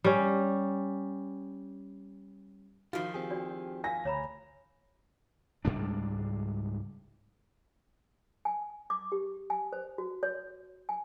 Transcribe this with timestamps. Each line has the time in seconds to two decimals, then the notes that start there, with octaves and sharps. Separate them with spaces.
0.04 G3 C#4
2.93 D#3 F3 F4 F#4
3.14 C4 G4 G#4
3.30 D4 F#4 D5
3.84 A#4 F5 G#5 A#6
4.05 D2 C#5 A#5 B5
5.65 C#2 G#2 G3 D4
8.45 G#5
8.90 D6
9.12 G4
9.50 G#5
9.73 C5
9.98 F#4
10.23 C#5
10.89 G#5